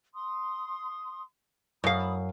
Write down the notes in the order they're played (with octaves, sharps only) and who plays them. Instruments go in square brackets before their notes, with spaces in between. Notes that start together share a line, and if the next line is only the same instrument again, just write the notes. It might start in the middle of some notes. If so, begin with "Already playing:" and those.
[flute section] C6 D#6
[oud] F#2 F5 [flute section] B5 D#6